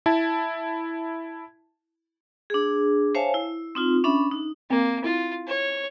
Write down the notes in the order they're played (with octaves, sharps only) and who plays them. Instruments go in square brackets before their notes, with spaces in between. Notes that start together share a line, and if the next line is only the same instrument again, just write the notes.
[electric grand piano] E4 A5
[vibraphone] D4 G#4
C5 C#5 E5 F5 G#5 A5
E4
C4 D#4 F4
C#4 D4 E5 B5
D#4
[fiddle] A#3 [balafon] C4
[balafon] E4 [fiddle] F4
[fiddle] C#5